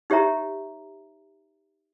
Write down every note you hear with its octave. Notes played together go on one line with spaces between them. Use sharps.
D#4 G4 C#5 E5 A#5